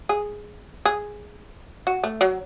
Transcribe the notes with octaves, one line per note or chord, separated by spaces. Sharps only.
G#4
G#4
F#4
A3
F#3